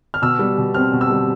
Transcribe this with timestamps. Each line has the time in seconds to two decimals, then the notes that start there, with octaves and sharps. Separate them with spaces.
0.14 F6
0.22 B2 E6
0.39 G3
0.58 B2
0.74 C4 F6
0.93 B2
1.01 E6
1.10 G3